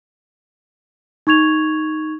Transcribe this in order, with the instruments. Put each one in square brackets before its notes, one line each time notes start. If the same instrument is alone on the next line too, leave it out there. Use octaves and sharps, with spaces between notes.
[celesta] D#4 C#6 G#6 F7